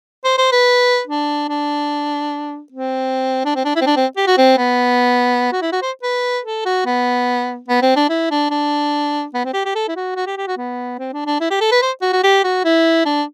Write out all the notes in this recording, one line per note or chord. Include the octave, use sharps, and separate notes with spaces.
C5
C5
B4
D4
D4
C4
D4
C4
D4
E4
C4
D4
C4
G4
F#4
C4
B3
F#4
E4
F#4
C5
B4
A4
F#4
B3
B3
C4
D4
E4
D4
D4
B3
C4
G4
G4
A4
E4
F#4
F#4
G4
G4
F#4
B3
C4
D4
D4
E4
G4
A4
B4
C5
F#4
F#4
G4
F#4
E4
D4